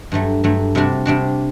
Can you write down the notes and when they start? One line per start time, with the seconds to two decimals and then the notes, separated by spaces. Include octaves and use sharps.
0.12 G2 F#3 A3
0.44 G2 F#3 A3
0.75 C3 G3 D4 F#4
1.05 C3 G3 D4 F#4